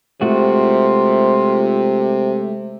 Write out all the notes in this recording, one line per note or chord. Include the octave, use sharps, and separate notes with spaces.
C3 G#3 A3 F4 F#4